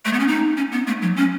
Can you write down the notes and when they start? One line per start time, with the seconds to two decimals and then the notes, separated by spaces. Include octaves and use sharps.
0.05 A3
0.13 B3
0.20 C#4
0.28 D#4
0.57 C#4
0.72 B3
0.87 A3
1.02 F#3
1.17 C#4